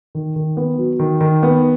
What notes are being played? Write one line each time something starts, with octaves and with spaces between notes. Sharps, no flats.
D#3
D#3
B3
F#3
D#3
D#3
B3